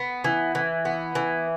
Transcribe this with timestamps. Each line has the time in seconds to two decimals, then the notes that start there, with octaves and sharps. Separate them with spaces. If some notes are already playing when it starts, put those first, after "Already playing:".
Already playing: B3
0.24 E3
0.55 E3
0.85 B3
1.15 E3